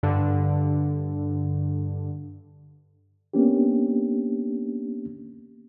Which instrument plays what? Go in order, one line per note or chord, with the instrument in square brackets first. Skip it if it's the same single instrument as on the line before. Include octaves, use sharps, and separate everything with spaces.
[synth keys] G2 D3
[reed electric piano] A#3 B3 C#4 D4 G4